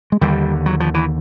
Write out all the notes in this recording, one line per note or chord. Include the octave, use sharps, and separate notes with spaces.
G#3
D#2 D3 G3
F#3
F3
E3